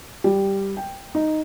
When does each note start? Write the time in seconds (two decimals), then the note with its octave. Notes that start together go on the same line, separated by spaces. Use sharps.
0.24 G3
0.77 G5
1.15 D#4